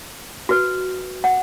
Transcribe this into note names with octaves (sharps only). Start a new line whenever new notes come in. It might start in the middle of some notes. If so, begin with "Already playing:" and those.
F#4 B4
F#5